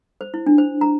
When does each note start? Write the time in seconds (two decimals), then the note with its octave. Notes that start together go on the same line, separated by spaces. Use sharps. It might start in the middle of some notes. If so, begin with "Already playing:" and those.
0.21 C5
0.34 E4
0.47 D4
0.58 C5
0.81 A#5